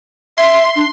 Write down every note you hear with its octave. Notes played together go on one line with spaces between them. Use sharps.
E5 C6
D4